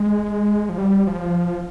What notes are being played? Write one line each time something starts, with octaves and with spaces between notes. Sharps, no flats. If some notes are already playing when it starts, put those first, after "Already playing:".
Already playing: G#3
F3
G3
F3